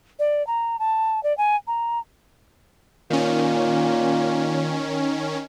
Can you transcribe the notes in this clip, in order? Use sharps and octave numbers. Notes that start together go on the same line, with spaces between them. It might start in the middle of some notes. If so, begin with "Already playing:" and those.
D5
A#5
A5
D5
G#5
A#5
A#2 D#3 C#4